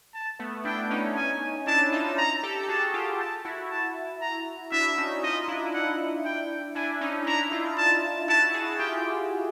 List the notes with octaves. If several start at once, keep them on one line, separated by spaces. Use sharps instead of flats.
A5
A3 B3
D4 E4 G5
C#4 D#4
G#5
D4 E4 A5
D#4 F4
A#5
G4 A4
A4
F#4 G#4 A5
F4 G4
A5
E4 F#4
A5
A#5
D4 E4 E5
C#4 D#4
D#4 F4 D#5
D4 E4
F#5
G5
D4 E4 G#5
C#4 D#4
D4 E4 A#5
D#4 F4
A5
E4 F#4 A5
F#4 G#4
F4 G4 G5